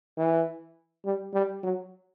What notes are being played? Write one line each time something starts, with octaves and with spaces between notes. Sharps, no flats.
E3
G3
G3
F#3